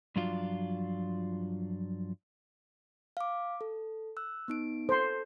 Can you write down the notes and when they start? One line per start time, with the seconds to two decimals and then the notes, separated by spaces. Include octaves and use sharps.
0.16 G2 F3 F#3 D4 F4
3.17 F5 D6
3.61 A4
4.17 E6 F#6
4.48 B3 D#4 D7
4.89 A4 C5 C6